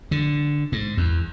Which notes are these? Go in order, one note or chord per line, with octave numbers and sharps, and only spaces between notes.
D3
G#2
E2